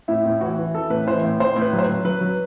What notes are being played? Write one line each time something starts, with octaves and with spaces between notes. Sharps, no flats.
A2 E4
A2
E3 F#4
E3
E3 A4
A2 B4
E3 C5
A2
A2 C5
A2
B4
F#3
C5
B4
F#3
F#3 B4
F#3